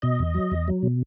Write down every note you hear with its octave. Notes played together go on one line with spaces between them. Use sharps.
B2 D#5
E2
F#3
E2
F#3
B2